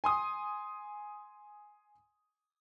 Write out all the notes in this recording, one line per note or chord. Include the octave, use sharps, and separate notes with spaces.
G#5 C6 D#6